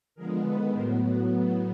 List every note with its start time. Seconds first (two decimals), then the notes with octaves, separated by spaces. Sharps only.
0.15 D3 F3 G#3 B3 G#4 A#4
0.44 D#3 G#3 B3 A4 B4
0.72 A2 F#3 B3 A#4 C5